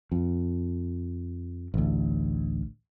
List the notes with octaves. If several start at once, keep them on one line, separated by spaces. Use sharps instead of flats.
F2
A1 D2